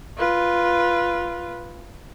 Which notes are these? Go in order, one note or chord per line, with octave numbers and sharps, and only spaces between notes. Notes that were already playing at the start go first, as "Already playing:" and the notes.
F4 B4